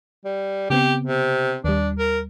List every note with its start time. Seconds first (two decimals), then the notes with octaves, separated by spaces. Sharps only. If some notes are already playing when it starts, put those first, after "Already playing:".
0.25 G3
0.70 C#3 B3 C4 G4
1.06 C3
1.64 D#2 G3 D4
1.99 A#4